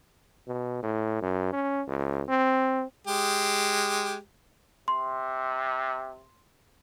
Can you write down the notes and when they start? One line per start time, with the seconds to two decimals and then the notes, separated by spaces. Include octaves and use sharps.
0.48 B2
0.83 A2
1.22 F#2
1.53 C#4
1.88 C#2
2.29 C4
3.07 G#3 G4
4.88 C3 C6